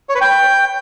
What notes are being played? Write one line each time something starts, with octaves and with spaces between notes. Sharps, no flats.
C#5
B4
G5